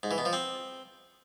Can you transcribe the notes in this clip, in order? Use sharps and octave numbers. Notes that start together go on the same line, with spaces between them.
G#2
E3
B2
F3
C4